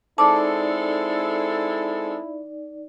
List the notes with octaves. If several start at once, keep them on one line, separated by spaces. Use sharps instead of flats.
G#3 C4 D#4 E4 A4 D5 A5 D6